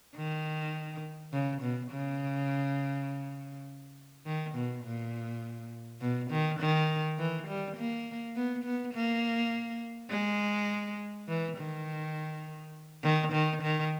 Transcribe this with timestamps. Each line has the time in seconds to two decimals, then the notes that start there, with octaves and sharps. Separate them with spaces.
0.16 D#3
1.33 C#3
1.62 B2
1.92 C#3
4.26 D#3
4.55 B2
4.84 A#2
6.01 B2
6.31 D#3
6.60 D#3
7.18 E3
7.48 G3
7.77 A#3
8.36 B3
8.64 B3
8.94 A#3
10.11 G#3
11.28 E3
11.57 D#3
13.03 D#3
13.33 D#3
13.63 D#3